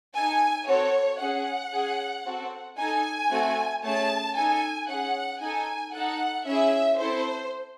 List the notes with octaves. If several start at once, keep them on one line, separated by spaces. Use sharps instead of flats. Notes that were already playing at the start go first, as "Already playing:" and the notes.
D#4 A4 G#5
C4 F#4 A4 C#5
C#4 G#4 F#5
C#4 G#4
C4 F#4 A4
D#4 A4 G#5
A3 C4 F#4 A4
A3 C#4 G#4 A5
D#4 A4 G#5
C#4 G#4 F#5
D#4 A4 G#5
D#4 A4 F#5
C#4 E4 G#4 E5
C4 E4 A4 C5